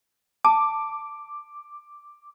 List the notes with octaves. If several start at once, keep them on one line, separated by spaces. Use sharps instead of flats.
A5 D6